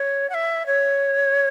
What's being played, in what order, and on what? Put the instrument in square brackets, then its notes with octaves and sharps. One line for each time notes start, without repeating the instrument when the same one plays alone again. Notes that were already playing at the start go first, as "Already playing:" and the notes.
Already playing: [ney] C#5
F#5
E5
C#5